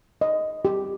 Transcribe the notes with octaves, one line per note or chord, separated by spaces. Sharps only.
D#5
G4